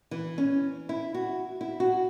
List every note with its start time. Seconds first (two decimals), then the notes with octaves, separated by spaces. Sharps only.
0.11 E3
0.38 C#4
0.89 E4
1.14 F#4
1.61 E4
1.80 F#4